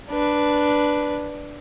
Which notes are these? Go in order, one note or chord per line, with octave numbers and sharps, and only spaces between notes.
D4 B4